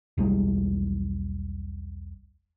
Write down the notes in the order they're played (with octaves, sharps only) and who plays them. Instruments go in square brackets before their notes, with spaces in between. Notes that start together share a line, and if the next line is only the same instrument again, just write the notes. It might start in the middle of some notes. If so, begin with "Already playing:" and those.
[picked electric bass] E1 B1 G3 G#3